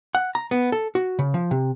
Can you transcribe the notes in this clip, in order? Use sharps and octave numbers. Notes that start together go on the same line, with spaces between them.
F#5
A#5
B3
A4
F#4
C#3
F3
C3